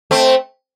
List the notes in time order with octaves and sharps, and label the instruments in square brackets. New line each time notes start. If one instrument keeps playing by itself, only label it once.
[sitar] A3 C4